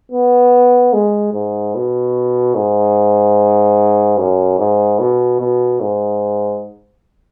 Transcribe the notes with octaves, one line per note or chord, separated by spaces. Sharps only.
B3
G#3
G#2
B2
G#2
F#2
G#2
B2
B2
G#2